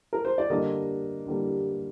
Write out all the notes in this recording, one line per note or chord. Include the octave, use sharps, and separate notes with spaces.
A#4
C5
D5
D3 G3 A#3 D#5
D3 G3 A#3